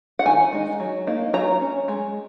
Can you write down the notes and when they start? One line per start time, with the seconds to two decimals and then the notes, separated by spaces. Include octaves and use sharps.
0.19 F#5
0.26 D#3 G#5
0.53 G#3 D#4
0.80 F#3
1.07 A#3 D#4
1.33 F#3 A#5
1.61 C#4
1.88 G#3